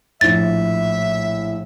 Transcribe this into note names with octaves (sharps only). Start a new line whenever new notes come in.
A#1 A2 E5 A6